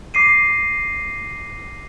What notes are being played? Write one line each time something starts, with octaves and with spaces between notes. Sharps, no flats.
D6 A#6 C7 D#7